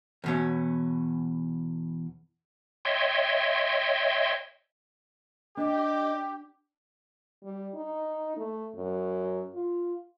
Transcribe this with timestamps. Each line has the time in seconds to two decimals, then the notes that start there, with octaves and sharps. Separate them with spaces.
0.24 E2 B2 C#4
2.85 C#5 D#5 E5 G5 C6
5.57 D4 G4 D#5
7.44 G3
7.74 D#4
8.37 A3
8.75 F#2
9.55 F4